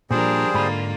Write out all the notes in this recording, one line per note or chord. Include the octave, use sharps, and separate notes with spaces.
A#2 F3 G3 D4 G#4 A#4 C5
G#2 D3 A#3 F4 B5